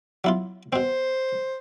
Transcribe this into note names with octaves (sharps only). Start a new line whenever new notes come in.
F#3 E4 F4
B2 C4 C5